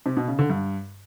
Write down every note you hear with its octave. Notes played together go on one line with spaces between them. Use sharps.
C3
B2
C#3
D3
G2